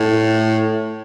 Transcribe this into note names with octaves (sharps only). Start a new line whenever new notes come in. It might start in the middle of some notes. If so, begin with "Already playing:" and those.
Already playing: A2